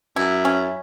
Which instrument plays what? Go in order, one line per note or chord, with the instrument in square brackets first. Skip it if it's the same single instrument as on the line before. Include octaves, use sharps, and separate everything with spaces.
[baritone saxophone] F#2 [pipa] E4
[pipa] C#4